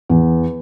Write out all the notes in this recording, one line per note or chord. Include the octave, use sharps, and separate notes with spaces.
E2